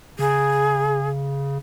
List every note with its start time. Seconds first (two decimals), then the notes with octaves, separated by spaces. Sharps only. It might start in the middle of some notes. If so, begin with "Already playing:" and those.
0.19 C#3 G#4